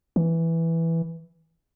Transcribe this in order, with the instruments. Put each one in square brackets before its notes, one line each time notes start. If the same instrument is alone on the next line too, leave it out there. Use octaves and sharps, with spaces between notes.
[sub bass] E3